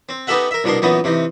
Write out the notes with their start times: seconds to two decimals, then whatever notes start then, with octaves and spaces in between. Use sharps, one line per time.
0.09 C4
0.27 B3 D#4 G4 A4 E5 F#5
0.51 A#4 E5
0.64 C2 B2 D4 A#4 C6
0.82 F#2 A#2 E3 B3 D#4
1.04 C3 E3 D#4